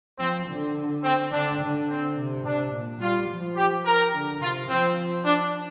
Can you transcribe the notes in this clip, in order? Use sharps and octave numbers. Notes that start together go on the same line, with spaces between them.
F3 C4
D3
C4
D3 D4
D3
C4
C3
C3 D4
A#2
G3 F4
F3
G4
A#4
D3
C3 F4
F3 C4
D4